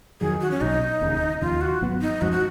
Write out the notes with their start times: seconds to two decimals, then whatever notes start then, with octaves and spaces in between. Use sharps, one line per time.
0.21 F2 D#3 F#3 G#4
0.41 F#4
0.51 C#4
0.61 B1 B2 F#3 D#4
1.01 F1 D#2 C#3
1.41 D#2 C#3 F3 F4
1.61 F#4
1.81 G#1 G#2 F#3 B3
2.01 D#4
2.21 F#2 F3 G#3 C#4 F#4
2.32 F#4